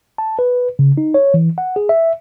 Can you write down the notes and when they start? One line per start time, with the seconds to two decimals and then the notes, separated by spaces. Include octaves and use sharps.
0.18 A5
0.39 B4
0.79 C#3
0.98 D#4
1.14 C#5
1.34 E3
1.58 F#5
1.76 G#4
1.89 E5